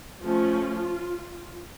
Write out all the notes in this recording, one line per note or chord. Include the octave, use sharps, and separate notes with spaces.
F3 A3 C#4 F4